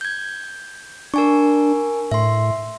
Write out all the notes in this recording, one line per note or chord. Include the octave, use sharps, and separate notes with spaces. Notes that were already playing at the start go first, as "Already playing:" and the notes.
G6 G#6
D4 A#4 G#5 C#6
A2 E5 C6